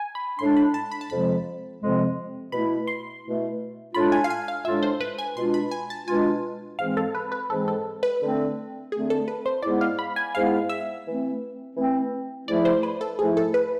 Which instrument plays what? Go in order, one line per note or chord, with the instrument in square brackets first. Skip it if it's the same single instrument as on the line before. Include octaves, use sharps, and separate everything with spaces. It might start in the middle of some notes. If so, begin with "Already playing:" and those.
Already playing: [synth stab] G#5
B5
[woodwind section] A2 G#3 D4 [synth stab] C6
[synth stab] B5
A5
B5
A5
[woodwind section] F2 C3 F3 G#3 C4 [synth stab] B5
[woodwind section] F2 C3 F3 G#3 C4
[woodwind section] B2 A3 E4 [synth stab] B5
[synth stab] C6
[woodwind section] B2 A3 E4
[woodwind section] A2 G#3 D4 F4 [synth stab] B5
[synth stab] G#5
F5
G#5
F5
[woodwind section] A2 G#3 D4 F4 [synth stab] E5
[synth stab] C5
B4
G#5
[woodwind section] B2 G#3 D4 F4 [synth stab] C6
[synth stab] B5
G#5
A5
[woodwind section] B2 G#3 D4 F4 [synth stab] G#5
[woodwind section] G#2 E3 G#3 C4 [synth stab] F5
[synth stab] A4
B4
B4
[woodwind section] G#2 E3 G#3 C4 [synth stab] A4
[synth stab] A4
B4
[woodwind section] D3 A3 C4
[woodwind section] D3 A3 C4 [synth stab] G#4
[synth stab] A4
B4
C5
[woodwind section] G#2 G#3 B3 E4 [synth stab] D5
[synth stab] F5
B5
G#5
[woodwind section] G#2 G#3 B3 E4 [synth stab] F5
[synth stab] E5
[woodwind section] E3 A3 C4
E3 A3 C4
[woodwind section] G#2 F3 A3 E4 [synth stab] D5
[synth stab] C5
B4
A4
[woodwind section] G#2 F3 A3 E4 [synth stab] G#4
[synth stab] A4
B4